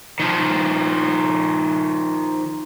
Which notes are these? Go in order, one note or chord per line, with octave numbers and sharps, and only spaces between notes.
D#3 F3